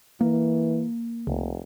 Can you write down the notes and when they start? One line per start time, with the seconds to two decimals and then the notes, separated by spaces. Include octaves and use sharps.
0.21 E3 A#3
1.27 F1 C#2